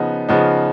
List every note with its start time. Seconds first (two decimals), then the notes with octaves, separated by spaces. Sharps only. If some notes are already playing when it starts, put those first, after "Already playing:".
Already playing: C#3 F3 B3 D#4
0.29 C#3 F3 B3 D#4